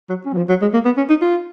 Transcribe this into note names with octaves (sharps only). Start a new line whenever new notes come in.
F#3
C#4
F#3
F3
F#3
G#3
A#3
B3
C#4
D#4
F4